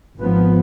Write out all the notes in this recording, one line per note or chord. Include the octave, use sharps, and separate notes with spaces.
G#1 G#2 F3 B3